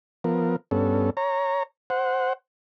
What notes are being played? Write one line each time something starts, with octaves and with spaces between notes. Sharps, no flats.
F3 B3 A#4
G2 B3 C#4 A4
C#5 A#5
C5 F#5